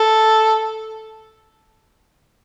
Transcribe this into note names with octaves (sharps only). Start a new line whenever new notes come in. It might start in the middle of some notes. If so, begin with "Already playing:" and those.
Already playing: A4